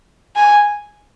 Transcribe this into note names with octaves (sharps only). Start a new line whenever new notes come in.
G#5